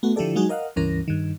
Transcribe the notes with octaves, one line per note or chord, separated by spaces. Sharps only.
A3 B3 F#4
D3 F3 E4 G4 A4 D5
F#3 G#3 D#4 F#4 G#4
A#4 D#5 F5 F#5
C#2 G2 E3 C#4 A#4 A#6
G2 D#3